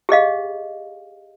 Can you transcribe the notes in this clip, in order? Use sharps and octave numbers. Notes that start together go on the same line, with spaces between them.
G4 G#4 D#5 F5